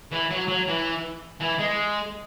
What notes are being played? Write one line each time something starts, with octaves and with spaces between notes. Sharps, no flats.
E3
F#3
F#3
E3
E3
G#3